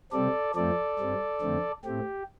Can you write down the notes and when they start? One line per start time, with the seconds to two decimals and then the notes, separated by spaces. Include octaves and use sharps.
0.12 C3 G3 C4 A4 D5
0.55 F2 F3 A3 C4 A4 D5
0.99 G2 G3 C4
1.41 F2 D3 A3 C4
1.84 A2 A3 C4 G4